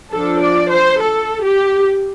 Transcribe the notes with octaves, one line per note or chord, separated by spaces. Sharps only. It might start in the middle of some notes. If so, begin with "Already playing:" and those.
F3 D4 A4
D5
C5
A4
G4